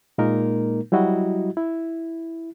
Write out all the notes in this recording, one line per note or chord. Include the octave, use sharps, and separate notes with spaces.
A#2 G#3 A#3 D#4 A#4
F#3 G3 E4 F#4 D#5
E4